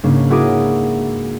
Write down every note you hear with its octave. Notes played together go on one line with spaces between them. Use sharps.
G#2 C#3 A#3 C#4 D4
E4 F#4 G#4 A#4 D6 D#6